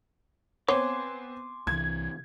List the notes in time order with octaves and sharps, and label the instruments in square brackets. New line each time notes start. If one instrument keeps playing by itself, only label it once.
[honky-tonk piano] B3 C4 [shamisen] C#5 F#5 [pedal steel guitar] G#5 C6 D6
[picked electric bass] C2 E3 [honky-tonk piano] G#6